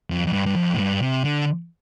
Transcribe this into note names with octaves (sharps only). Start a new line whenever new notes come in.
F2
F2
G2
G2
F2
A2
G2
C3
D3